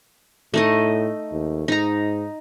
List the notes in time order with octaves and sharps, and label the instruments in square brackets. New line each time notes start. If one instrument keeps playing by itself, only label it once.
[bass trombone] A2 [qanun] A3 D#4 D#5
[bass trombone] D#2
[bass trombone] G#2 [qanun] D#4 A#5